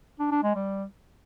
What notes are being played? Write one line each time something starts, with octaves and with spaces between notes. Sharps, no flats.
D4
D4
G#3
G3